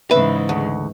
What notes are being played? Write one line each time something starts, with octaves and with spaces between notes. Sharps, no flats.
G#2 C#3 E3 B4 E5
D2